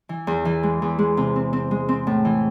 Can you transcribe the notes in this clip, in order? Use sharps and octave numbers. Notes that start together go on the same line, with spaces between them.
E3
E2
E3
G#3
E2
G#3
C3
C4
C4
G#3
C4
A2
E3